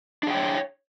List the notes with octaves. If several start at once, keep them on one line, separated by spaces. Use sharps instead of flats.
D4 G#4 C#5 G5